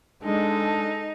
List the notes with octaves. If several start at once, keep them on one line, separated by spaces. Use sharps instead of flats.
G#3 D4 D#4 A4